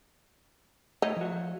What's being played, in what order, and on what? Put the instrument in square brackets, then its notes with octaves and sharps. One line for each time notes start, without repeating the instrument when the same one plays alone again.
[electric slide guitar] A3 C#5 E5 [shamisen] D#4
[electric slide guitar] F3 F#4